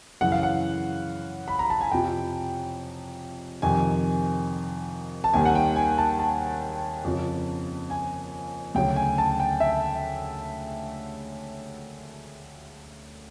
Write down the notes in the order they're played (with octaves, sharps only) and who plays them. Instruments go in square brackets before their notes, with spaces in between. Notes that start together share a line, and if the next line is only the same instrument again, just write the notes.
[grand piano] F#2 C#3 E3 F#5
F5
F#5
B5
A#5
A5
G#5
F2 C3 F3 G5
F2 C3 D#3 G#5
A5
D#2 D#3 G3 G#5
F#5
G5
G#5
A5
A5
F2 C#3 F3
G#5
D2 C#3 F#3 G5
G#5
A5
G5
E5